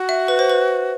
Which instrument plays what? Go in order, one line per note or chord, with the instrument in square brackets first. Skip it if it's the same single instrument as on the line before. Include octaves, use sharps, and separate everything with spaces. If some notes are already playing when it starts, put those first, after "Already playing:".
Already playing: [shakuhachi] F#4
[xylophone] E5
B4
C5
B4